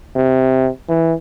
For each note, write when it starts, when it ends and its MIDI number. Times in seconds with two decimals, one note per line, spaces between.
0.16 0.69 48
0.89 1.13 52